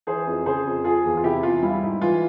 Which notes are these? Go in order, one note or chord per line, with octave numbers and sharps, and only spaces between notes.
E3 G#4 C5
F2
C#3 G#4 C5
F2
F3 F4 G#4
E2
F4
C3 E4 G4
E2 F4
G3 E4
G#2
E3 F4